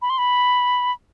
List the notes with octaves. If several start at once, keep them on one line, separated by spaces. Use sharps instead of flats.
B5
C6
B5